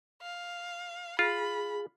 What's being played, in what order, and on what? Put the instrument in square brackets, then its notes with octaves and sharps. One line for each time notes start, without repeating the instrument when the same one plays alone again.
[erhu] F5
[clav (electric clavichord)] F4 [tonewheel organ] G#4 [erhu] B5